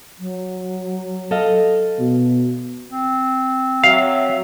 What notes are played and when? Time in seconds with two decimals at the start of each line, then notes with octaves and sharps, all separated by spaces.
0.19 F#3
1.31 A4 D#5 F5
1.99 B2
2.90 C4
3.84 F#3 E5 F5